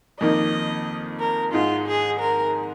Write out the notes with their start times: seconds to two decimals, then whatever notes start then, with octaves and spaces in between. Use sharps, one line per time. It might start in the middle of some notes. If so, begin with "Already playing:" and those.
0.20 F2 D#3 A#3 D#4 D#5
1.20 A#4
1.52 G#2 G#3 D#4 F4
1.86 G#4
2.20 A#4